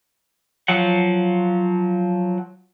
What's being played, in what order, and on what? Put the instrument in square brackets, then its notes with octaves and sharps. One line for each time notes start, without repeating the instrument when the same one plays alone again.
[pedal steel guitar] F3 F#3 F#5